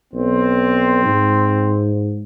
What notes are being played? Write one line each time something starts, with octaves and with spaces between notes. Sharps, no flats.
B1 C4
G#2